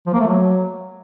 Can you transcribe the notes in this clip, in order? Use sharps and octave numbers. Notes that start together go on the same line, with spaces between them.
F3
A#3
A3
F#3